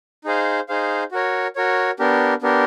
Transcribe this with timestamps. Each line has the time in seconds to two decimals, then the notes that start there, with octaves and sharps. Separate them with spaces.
0.25 D#4 G#4 C5 F5
0.69 D#4 G#4 C5 F5
1.12 F#4 A#4 C#5
1.56 F#4 A#4 C#5
1.99 B3 D4 G4 A#4
2.42 B3 D4 G4 A#4